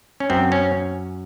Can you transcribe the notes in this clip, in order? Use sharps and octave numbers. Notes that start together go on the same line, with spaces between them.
C#4
F#2 C4
C#4